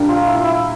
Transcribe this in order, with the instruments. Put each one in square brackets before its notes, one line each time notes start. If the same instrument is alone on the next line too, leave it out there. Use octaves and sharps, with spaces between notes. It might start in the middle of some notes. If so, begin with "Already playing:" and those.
Already playing: [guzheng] A#2 G3 D4 [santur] G4 A#4
[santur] F4
E4
F4
E4